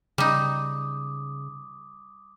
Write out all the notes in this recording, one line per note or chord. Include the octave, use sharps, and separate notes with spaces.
C#3 G3 D#4 D6 D#6